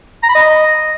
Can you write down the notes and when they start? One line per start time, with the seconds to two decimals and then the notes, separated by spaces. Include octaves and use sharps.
0.23 A#5
0.29 B5
0.35 D#5